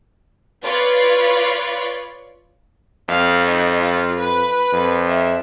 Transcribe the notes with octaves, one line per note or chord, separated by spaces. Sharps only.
F4 B4 C#5 D5
F2 F5
D#4
F4
B4
F2
E5